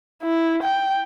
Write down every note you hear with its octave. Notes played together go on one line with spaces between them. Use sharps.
E4
G5